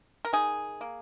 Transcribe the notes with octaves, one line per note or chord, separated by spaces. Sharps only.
A#4
D#3 G#4
A#3